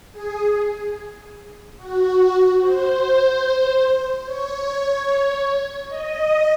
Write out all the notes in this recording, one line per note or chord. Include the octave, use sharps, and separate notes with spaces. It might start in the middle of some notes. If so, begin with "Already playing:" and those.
G#4
F#4
C5
C#5
D#5